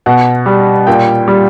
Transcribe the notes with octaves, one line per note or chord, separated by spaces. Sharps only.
B2 F#5
G3
A#2 G5
G3